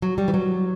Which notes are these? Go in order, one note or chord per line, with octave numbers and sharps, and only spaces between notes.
F#3
G3
E3
F#3